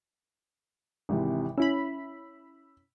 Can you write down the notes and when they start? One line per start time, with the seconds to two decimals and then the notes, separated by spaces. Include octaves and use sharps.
1.09 G#1 C3 E3
1.58 C#4 E4 B5 E6